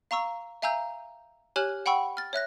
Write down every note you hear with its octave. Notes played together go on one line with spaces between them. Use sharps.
F5 A#5 C#6 E6
E5 F5 G#5 A#5 E6 G6
G4 C#5 G#5 F6 F#6 F#7
F#5 G5 B5 C#6 E6
F6 A6
C#5 E5 F#6 A#6